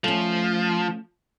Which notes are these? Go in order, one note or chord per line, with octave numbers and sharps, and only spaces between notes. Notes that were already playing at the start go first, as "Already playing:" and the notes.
F3 A3 C#4